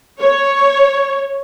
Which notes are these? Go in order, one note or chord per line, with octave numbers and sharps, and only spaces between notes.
C#5